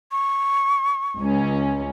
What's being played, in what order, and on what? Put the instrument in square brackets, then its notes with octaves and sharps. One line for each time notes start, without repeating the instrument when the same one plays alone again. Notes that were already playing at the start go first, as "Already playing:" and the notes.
[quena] C#6
[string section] C#2 C#4